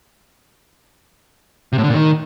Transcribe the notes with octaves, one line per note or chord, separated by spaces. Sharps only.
C3
A2
D3
A#2
D#3